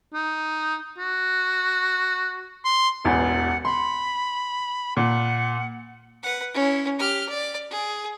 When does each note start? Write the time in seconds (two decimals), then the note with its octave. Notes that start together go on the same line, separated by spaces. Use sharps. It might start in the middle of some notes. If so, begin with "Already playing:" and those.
0.13 D#4
0.98 F#4
2.65 C6
3.05 E1 A1 E2 F#5
3.65 B5 C6
4.97 A#2 F#5
6.23 B4 F#5
6.54 C#4 E4
6.99 G4 F6
7.29 D5
7.70 G#4